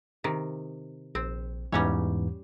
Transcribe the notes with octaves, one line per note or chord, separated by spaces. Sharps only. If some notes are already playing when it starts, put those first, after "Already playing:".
C3 D#3
A#1 C4
E2 G#2 E3 G3 C#4 C#5